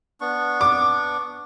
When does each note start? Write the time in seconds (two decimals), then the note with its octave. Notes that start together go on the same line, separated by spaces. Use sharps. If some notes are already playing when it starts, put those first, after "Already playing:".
0.21 B3 D4 C#6
0.61 D6